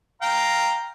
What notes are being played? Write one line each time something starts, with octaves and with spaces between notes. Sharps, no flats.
F5 G5 A#5